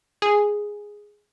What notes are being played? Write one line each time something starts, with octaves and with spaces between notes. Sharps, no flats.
G#4